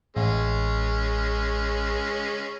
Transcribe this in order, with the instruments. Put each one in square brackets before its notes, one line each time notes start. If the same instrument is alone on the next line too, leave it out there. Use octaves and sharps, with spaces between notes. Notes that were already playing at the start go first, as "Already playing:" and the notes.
[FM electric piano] A1 [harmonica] G#3 C#4